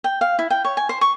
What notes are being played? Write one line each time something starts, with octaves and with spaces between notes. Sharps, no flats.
G5
F5
E4
G5
C#5
G#5
C5
C#6